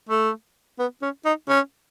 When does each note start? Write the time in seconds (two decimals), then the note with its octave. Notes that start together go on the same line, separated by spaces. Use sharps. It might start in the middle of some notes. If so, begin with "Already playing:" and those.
0.09 A3
0.79 B3
1.02 C#4
1.25 D#4
1.49 C#4